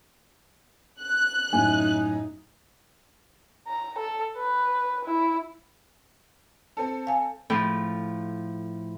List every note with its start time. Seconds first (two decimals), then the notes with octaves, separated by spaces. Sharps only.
1.01 F#6
1.53 F#2 A2 D#4 G#5
3.67 A#5
3.98 A4
4.37 B4
5.05 E4
6.77 C4 A4
7.07 F5 G#5
7.50 A2 F3